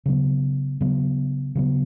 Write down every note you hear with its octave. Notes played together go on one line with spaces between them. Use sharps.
C#3 F#3 B3
C#3 F#3 B3
C#3 F#3 B3